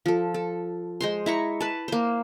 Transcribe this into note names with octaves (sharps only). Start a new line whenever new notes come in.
F3 A4
A4
G#3 C5 C6
E4 A#5 C#6
B4 A5
A#3 C5